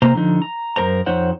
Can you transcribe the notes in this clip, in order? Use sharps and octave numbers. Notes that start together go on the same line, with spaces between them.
C3 A#3 C5 A#5
D3 F3 D#4
A#5
F#2 A#4 C5 A#5
F2 D#4 C5 C#5 F#5